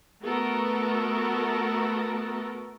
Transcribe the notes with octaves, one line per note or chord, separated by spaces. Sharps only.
A3 B3 F#4 A4 A#4